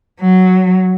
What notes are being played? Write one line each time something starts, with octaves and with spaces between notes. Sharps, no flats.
F#3